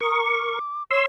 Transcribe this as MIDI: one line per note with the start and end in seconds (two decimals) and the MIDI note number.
0.01 0.59 70
0.01 0.59 85
0.01 0.22 87
0.23 0.83 86
0.91 1.02 73
0.91 1.06 84
0.91 1.06 88